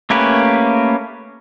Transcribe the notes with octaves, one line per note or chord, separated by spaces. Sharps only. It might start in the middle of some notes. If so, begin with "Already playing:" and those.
A3 A#3 C#4 G4 B4